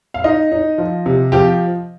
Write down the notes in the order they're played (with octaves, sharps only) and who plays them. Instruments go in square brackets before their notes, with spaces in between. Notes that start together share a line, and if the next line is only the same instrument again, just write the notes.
[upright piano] F5
D#4 D#5
D#4
F3
C3
F3 G4